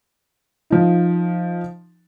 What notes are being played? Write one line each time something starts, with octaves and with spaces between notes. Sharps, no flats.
F3 D#4